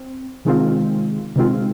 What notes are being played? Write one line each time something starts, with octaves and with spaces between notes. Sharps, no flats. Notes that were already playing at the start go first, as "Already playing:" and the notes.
Already playing: C4
C3 D#3 G#3 C4 F4
C3 D#3 G#3 C4 F4